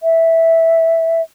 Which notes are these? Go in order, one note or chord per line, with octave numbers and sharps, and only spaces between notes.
E5